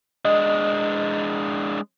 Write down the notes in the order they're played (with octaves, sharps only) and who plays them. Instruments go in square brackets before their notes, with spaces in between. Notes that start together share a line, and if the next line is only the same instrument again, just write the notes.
[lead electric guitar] G#3 D4 [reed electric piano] D#5